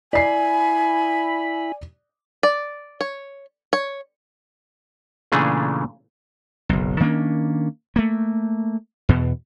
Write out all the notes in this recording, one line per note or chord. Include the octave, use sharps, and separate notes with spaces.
E4 D5 G#5 B5 C7
D5
C#5
C#5
A#2 C#3 E3 A3 D4 G#4
F#1 B1
D#3 A#3 C#4 D4
A3 A#3
E2 B2